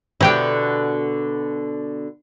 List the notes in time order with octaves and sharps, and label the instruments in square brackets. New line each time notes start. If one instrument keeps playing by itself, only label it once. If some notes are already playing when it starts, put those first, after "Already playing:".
[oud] B2 D3 [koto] E4 G4 G5